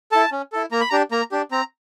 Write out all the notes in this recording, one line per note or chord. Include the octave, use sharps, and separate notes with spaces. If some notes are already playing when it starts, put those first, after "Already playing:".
E4 A4 A5
C#4
E4 A4
A#3 A#5
B5
A#5
D4 G4
A#3 A#5
D4 G4
C4 A#5